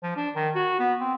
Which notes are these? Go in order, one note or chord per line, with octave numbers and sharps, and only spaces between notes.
F3
D4
D#3
F#4
B3
C4